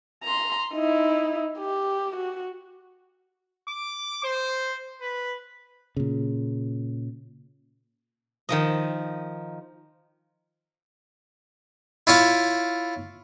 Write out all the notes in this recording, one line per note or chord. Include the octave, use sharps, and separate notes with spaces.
A#5 C6
D#4 E4
G4
F#4
D6
C5
B4
A#2 C#3
D#3 F3 D#5
E4 F4 C#5 F5